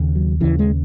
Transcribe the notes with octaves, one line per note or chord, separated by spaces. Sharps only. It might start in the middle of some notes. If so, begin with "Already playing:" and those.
Already playing: D#2 C#3
F#3
D#2 C#3 E3
G#3